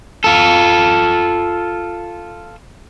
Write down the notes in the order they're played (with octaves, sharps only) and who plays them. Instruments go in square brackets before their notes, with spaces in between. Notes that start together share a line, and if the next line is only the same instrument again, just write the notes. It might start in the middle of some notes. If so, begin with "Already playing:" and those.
[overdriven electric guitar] F4 A4